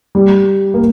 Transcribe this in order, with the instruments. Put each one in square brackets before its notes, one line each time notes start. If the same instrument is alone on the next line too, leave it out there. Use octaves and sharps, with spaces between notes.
[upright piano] G3
A#3